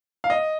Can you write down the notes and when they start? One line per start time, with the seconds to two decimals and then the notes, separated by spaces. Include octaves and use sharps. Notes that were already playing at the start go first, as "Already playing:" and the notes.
0.24 F5
0.30 D#5